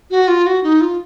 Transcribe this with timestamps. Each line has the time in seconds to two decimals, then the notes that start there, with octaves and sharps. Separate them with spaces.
0.11 F#4
0.28 F4
0.47 F#4
0.64 D#4
0.81 F4